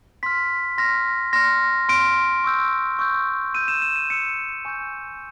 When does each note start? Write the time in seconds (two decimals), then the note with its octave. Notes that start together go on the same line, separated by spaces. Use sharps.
0.23 C6 F6 B6
0.78 C6 F6 A#6
1.33 C6 F6 A#6
1.89 C6 F6 D7
2.44 C#6 E6 G6
2.99 C#6 E6 G6
3.55 C#6 E6 G6 D#7
3.68 E7
3.82 E7
3.96 D#7
4.10 C#6 E6 G6 C#7
4.65 G#5 C#6 E6 G6